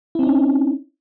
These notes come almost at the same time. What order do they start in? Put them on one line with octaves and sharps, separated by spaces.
E4 C4 D#4 C#4